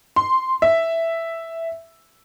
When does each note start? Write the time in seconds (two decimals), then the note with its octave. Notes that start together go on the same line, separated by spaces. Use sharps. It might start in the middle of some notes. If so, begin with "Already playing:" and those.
0.16 C6
0.62 E5